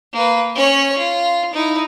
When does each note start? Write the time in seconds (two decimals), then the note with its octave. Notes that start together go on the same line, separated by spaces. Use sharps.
0.13 A#3 B4
0.55 C#4 C#5
0.98 F4
1.53 D#4 E4